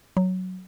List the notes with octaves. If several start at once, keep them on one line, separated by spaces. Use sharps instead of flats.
F#3